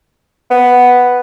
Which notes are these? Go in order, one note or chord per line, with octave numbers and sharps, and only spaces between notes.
B3